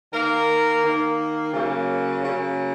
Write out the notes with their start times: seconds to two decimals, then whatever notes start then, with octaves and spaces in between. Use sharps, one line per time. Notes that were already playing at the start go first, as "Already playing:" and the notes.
0.12 D#3 A#3 A#4
0.83 D#3 A#3
1.52 C#3 F#3 A#3
2.23 C#3 F#3 A#3